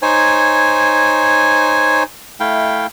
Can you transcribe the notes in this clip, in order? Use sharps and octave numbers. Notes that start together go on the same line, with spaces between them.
D#4 C5 C#5 G#5
A3 E4 F5 G5